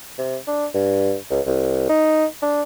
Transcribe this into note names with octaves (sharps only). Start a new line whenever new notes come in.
C3
D4
G2
C#2
C2
D#4
D4